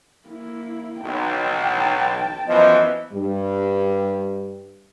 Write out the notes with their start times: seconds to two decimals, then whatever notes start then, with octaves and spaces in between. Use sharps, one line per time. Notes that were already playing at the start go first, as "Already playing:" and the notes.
0.28 A#3 E4
1.03 B1 G5 A5
2.48 F#2 E3 F3 B3 B4 D#5
3.13 G2 G3